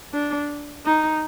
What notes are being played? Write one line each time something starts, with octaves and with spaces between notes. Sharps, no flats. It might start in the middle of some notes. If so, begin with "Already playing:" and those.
D4
D#4